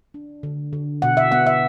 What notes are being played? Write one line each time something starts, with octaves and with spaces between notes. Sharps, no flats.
D4
D3
D3
B2 F#5
E5
B3 F#5
E5